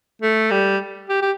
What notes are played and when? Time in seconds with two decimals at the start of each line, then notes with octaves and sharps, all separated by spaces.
0.22 A3
0.51 G3
1.09 G4
1.22 G4